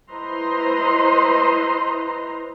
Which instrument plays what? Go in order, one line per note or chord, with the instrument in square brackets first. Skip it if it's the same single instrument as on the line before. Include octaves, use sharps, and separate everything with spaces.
[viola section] E4 B4 C5 D#5 A#5 C6